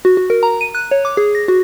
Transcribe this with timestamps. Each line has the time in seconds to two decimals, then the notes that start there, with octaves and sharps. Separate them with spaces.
0.05 F#4
0.17 F#4
0.30 A#4
0.43 A#5
0.61 D#7
0.75 F#6
0.91 C#5
1.05 D6
1.17 G#4
1.35 A#6
1.48 F#4